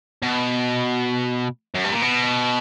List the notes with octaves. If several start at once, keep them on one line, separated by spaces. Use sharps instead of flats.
B2
F#2
G2
A#2
B2